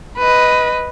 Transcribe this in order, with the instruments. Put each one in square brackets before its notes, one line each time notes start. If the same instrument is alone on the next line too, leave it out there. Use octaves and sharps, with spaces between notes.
[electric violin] B4 D#5